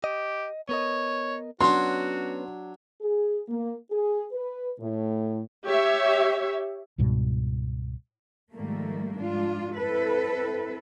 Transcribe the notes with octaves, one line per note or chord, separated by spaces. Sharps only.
G4 D#5
B3 A#4 C#5 D#5
F#3 B3 C#4 D4 F#4 C6
G#4
A#3
G#4
B4
A2
G4 C#5 E5
C#2 G#2 B2 G3
G#2 D#3 F3 G3 A3 A#3
G#2 D4 F4
C4 E4 A4 B4